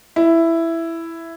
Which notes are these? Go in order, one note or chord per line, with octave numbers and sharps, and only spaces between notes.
E4